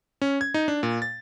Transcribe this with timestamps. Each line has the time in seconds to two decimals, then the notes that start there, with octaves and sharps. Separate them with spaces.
0.22 C#4
0.41 G#6
0.54 D#4
0.68 D4
0.83 A#2
1.02 A6